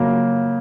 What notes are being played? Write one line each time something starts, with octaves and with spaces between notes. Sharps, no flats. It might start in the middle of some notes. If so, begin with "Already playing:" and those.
Already playing: C#3 F#3 A#3